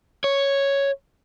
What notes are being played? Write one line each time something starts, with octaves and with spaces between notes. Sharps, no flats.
C#5